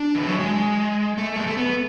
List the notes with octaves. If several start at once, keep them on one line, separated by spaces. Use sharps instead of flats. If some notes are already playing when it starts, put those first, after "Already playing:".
Already playing: D4
E3
F#3
G#3
A3
G#3
A3
B3